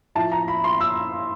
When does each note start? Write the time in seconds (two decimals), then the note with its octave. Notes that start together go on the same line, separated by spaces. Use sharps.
0.15 A2 F3 A5
0.32 A#5
0.48 B5
0.64 C6
0.81 E6